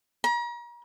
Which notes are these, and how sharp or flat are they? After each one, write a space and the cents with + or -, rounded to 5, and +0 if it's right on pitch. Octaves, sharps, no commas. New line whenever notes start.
A#5 +40